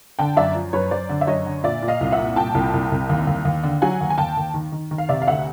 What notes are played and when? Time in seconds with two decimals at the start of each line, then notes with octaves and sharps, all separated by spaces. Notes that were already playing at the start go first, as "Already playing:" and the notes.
0.19 D3 G5 A5
0.37 F#2 D5 E5
0.55 F3
0.73 F#2 B4 C#5
0.91 F#2 C5 D5
1.09 D3
1.21 E5
1.27 F#2 C#5 D#5
1.46 D3
1.64 A#2 D5 E5
1.82 A#2
1.88 D#5 F5
2.01 C2
2.12 E5 F#5
2.19 A#2
2.36 A#2 G5 A5
2.54 C2
2.74 C2
2.92 C2
3.09 D#2
3.27 D#2
3.45 D#2
3.63 D3
3.82 F#3 F#5 G#5
4.01 D#2
4.10 G#5
4.18 D#2 G5 A5
4.37 D#2
4.54 D#3
4.72 D#3
4.91 D#3
4.98 F5
5.09 C3 D5 E5
5.22 F5
5.27 D2 E5 F#5